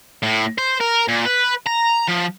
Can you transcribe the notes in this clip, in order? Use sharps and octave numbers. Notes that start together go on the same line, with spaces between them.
A2
C5
A#4
A#2
B4
A#5
F3